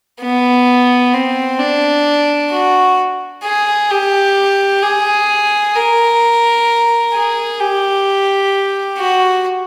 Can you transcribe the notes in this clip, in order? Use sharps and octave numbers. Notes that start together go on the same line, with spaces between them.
B3
C4
D4
F#4
G#4
G4
G#4
A#4
G#4
G4
F#4